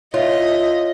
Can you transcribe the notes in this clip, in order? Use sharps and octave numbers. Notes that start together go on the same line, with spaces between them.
F4 C#5 D#5 E5